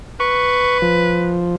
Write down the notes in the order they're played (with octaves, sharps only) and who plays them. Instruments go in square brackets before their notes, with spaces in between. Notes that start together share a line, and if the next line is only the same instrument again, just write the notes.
[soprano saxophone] B4 [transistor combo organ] C#6
[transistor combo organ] F3